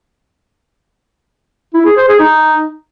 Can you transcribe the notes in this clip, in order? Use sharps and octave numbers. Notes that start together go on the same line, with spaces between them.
E4
G#4
C5
G#4
D#4